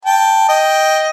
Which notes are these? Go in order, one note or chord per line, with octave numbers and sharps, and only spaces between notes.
G5 A5
D#5 G5